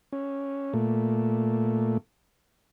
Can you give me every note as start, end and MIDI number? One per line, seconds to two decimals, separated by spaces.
0.13 0.73 61
0.73 1.97 46
0.73 1.97 57